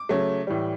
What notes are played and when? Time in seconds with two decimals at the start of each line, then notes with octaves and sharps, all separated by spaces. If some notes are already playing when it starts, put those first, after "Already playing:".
Already playing: D6
0.09 C#3 F#3 A3
0.47 A2 E3 G3